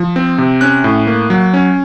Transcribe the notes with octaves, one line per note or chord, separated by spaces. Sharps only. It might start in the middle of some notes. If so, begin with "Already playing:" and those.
Already playing: F3
C4
C3
C#4 F#6
A2
A#3
F#3
C#4